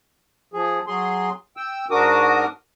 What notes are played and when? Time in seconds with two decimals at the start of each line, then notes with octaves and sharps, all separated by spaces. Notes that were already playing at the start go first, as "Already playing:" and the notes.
0.53 F3 G#4
0.87 F#3 G#4 C6
1.57 G5 E6
1.91 G#2 D4 F#4 A#4 D6 D#6